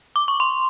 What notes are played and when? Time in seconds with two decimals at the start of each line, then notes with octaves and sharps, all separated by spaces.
0.16 D6
0.28 C#6
0.40 C6